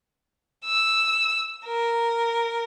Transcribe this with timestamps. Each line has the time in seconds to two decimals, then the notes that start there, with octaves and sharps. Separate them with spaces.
0.65 E6
1.67 A#4